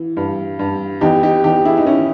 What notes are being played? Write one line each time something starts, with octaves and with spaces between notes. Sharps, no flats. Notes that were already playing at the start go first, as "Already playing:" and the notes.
Already playing: E3
G2
G2
E2 D#4 G4
D#4 G4
E2 D#4 G4
E4 G#4
D#4
D#3 C#4 E4